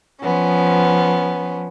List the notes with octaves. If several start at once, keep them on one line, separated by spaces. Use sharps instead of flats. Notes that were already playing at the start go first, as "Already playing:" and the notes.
F3 B3 C#4